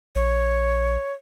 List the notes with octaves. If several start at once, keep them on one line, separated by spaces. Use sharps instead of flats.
A#1 C#5